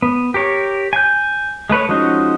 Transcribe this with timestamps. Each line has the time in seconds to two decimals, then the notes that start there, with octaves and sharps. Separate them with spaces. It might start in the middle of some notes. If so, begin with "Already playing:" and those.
0.02 B3
0.34 G4 A#4 C#5
0.93 G#5 G6
1.70 G#3 A3 B4 C#5
1.89 F3 G#3 C#4 D#4 F#4